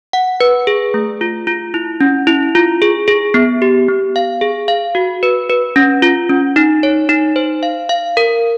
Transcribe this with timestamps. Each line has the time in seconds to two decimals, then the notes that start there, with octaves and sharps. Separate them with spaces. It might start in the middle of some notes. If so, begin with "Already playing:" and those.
0.13 F#5
0.40 B4
0.67 G#4
0.94 A3
1.21 F4
1.47 F4
1.74 E4
2.01 C#4
2.27 E4
2.55 F4
2.82 G#4
3.08 G#4
3.34 B3
3.62 G4
3.88 B3
4.16 F5
4.41 G#4
4.68 F5
4.95 F#4
5.23 B4
5.50 B4
5.76 C#4
6.02 F4
6.30 C#4
6.56 D#4
6.83 C#5
7.09 D#4
7.36 C5
7.63 F5
7.89 F5
8.17 A#4